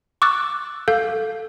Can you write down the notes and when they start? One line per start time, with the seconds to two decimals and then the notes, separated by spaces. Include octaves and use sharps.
0.22 C#6 D6 E6 F#6 A6
0.88 A4 F5 G6